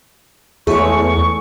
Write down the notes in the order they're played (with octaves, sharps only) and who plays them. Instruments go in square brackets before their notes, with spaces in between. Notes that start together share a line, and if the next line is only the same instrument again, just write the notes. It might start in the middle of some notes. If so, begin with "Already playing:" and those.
[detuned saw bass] E2 [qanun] G#3 A3 [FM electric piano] G#4 C#5 [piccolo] C#6